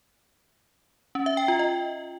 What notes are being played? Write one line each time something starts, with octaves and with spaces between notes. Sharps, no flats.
C#4
E5
G5
F4
D#5